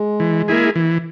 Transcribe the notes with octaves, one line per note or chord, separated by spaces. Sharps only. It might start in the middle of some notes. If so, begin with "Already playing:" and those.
Already playing: G#3
E3
A#3 E4 G#4
E3